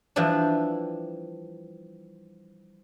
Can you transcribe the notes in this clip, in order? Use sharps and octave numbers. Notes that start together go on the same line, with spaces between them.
E3 F3 G3 D4